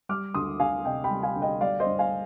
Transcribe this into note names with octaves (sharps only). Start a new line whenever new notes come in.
G3 D6 F6
D2 C6 D#6
D2 F5 G#5
C3 D#5 G5
G5 B5
G3
F5 G#5
D2
D#5 G5
G3 D5 F5
C5 D#5
G2
F5 G#5